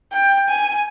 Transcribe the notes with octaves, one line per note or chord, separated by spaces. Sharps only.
G5
G#5